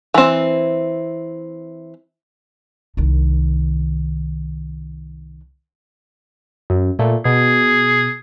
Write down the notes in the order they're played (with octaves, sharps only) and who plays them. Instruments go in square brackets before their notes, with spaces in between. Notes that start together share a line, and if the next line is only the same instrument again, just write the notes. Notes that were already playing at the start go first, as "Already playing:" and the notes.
[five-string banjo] E3 C4
[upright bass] C2 D#3
[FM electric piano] F#2
A#2 A3
[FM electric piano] B2 [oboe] G#4